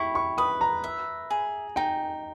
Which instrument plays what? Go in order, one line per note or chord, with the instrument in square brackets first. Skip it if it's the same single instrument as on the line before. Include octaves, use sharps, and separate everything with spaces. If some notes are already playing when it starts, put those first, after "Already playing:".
Already playing: [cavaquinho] E4 G4 [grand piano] B5 C#6
[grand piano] C#6
[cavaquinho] B4 [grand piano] D#6
[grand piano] A#5
[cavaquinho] E5
G#4
[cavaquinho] D#4 [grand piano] G5